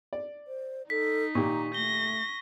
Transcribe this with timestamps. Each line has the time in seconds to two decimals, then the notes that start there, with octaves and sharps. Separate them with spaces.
0.13 D5
0.47 C5
0.90 D#4 A4 B6
1.35 A#2 D#3 G4 A#5 C#6
1.74 A3 A#6 G7